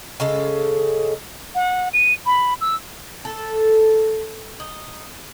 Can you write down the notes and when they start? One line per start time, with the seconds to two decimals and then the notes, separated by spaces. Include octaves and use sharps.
0.20 C#3 G#3 A4
1.55 F#5
1.93 D#7
2.26 B5
2.61 E6
3.25 A4
4.60 D#4